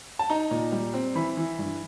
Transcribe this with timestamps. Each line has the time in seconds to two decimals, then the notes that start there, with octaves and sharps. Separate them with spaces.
0.19 A5
0.30 D#4 A#5
0.51 A#2
0.72 G3
0.94 C4
1.15 E3 B5
1.37 E3
1.59 G2